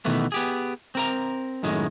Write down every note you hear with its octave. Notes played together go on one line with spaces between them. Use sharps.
B2 D#3 E3 A3 B3
B3 G4 G#4
C4 A#4 A#5
F#2 A2 D#3 G#3